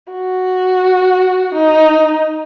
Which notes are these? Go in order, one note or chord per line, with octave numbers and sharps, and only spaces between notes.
F#4
D#4